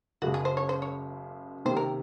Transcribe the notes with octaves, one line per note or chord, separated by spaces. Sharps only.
F#1 F#2 C#3 G#3 F#4
G#4
C5
C#5
C5
C#5
C3 D#3 A#3 C5
A#4